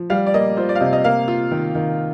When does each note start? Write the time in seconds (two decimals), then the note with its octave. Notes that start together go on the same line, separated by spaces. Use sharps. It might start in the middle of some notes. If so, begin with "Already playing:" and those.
Already playing: F3
0.10 G3 F5
0.26 D5
0.34 A#3 D#5
0.57 F4 C5
0.69 D5
0.75 F5
0.80 C3 D#5
0.93 D#5
1.04 A#3 F5
1.28 F4
1.51 D#3
1.75 D#3